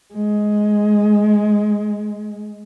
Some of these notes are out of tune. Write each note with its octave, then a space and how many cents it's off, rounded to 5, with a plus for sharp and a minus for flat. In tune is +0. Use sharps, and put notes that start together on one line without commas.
G#3 +10